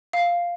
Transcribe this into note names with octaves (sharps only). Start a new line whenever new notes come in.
F5